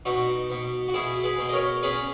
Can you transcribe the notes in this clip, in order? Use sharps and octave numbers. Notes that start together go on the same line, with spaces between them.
B2 D#4 F#4
B2
F#4
B2 E4 G#4
G#4 B4
B2
D#5
A#4 C#5
C#4 G#4 B4